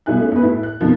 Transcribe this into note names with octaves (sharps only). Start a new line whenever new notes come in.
B1 G3 E4 G#5 F#6
A3 C#4
E2 B4
A2 E4
F#6
F2 B2 D#3 F3